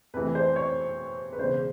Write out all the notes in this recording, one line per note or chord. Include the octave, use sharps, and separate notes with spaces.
F2 C3 E3 A3 B4
C5
C#5
B4
E1 E2 C#3 C5